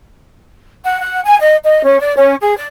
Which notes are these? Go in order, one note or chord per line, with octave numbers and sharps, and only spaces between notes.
F#5
F#5
G#5
D#5
D#5
C#4
D5
C#4
G#4
D5